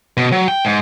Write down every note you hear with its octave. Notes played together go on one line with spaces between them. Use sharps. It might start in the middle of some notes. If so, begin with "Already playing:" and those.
B2
F#3
G5
G#2